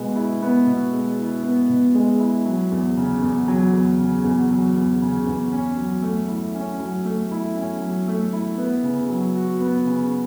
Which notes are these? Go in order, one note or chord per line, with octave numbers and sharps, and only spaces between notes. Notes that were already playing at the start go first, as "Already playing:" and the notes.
Already playing: B2 G#3 B3
E4
B3
B2
G#3
E4
B3
B2
G#3
E4
F#3
E2
C#3
E2
F#3
E2
C#3
E2
F#3
E2
C#3
E2
C#4
F#3
A3
E4
C#4
F#3
A3
E4
C#4
F#3
A3
E4
B3
C#3
F#3
F#4
B3
C#3